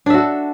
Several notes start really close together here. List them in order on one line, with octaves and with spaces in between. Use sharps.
D4 E5 F#4 A4